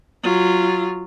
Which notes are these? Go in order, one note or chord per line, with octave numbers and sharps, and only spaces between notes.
F#3 F4